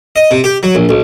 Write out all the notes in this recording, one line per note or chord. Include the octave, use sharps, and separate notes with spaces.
D#5
C3
G4
F#3
A#1
B1